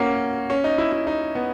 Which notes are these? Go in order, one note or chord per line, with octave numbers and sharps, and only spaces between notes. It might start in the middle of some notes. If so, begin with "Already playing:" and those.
Already playing: A#3 C#4 F#4
C#4
D#4
E4
E4
D#4
B3